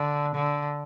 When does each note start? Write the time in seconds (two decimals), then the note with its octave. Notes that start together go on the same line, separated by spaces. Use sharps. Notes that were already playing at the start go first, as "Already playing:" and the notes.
Already playing: D3
0.35 D3